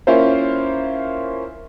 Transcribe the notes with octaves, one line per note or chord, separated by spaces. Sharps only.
A#3 C#4 E4 F4 C5